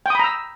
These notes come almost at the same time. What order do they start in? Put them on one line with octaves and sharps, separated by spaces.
G5 D#6 B5 A#5 E6